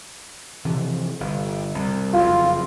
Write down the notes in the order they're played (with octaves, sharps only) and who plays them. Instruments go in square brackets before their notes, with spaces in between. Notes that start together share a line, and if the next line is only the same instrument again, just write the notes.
[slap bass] C3 E3 F3
G1
C2
[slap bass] F#1 F2 [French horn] F4